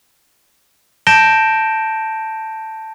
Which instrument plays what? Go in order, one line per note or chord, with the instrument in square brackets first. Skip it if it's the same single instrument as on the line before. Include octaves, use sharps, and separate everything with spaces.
[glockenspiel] A5 G6 A#6 D7 E7 G7